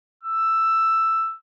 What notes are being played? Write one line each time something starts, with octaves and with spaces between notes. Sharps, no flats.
E6